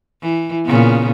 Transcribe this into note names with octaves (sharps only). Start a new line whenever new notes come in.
E3
A#2 C#3 B3